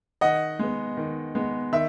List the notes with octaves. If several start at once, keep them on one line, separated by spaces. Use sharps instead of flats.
D#3 D#5 F#5
G#3 B3
D#3
G#3 B3
D#3 E5